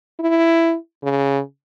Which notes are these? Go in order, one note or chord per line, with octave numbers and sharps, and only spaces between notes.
E4
C#3